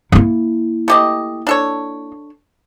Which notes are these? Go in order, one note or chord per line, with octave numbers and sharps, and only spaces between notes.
A#3 E4
A3 G4 D#5
D4 A4 C#5